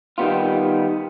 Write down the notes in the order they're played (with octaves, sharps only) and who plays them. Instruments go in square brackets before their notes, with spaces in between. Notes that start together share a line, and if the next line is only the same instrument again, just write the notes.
[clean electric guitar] D#3 G3 B3 F4